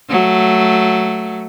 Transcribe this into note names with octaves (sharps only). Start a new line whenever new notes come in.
F#3 A3